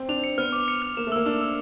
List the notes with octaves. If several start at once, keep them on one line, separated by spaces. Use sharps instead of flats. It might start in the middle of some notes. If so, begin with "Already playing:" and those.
Already playing: C4
D4 F7
C#7
B3 F6
D6
C#7
F6
A#3 E7
A3
A#3 E6
D4 E6
E6